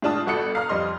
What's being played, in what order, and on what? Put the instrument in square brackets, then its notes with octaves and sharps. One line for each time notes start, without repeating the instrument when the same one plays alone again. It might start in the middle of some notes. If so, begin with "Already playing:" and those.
[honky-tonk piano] A2 G#3 D4 F4 A5 D#6
G1 F#4 A4 F#6 C#7
F5 A#5 D#6 F6
F2 G3 D#5 C6